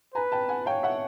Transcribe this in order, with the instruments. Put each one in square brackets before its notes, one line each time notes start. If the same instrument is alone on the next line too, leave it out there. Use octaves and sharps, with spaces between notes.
[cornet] B4 [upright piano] G#5 A#5
[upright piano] G5 A5
F#5 G#5
[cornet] C#5 [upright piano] F5 G5
[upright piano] E5 F#5